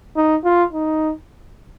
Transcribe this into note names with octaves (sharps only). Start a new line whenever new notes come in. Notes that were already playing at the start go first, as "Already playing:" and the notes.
D#4
F4
D#4